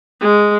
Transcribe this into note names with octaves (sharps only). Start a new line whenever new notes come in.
G#3